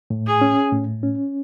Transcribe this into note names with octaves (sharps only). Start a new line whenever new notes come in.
A2
G#4
C#4
A2
C#4